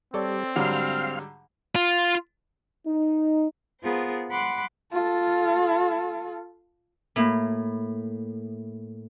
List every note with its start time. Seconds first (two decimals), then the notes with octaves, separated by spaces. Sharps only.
0.14 G3 C4 A4 C#5 D5
0.56 G#2 D3 F#3 G3 F5 C6 F6
1.75 F4
2.87 D#4
3.82 B3 F4 G#4 A#4 C5
4.30 F#5 B5 C6 D6 F#6
4.93 F4 A4
7.16 A2 A#3 E4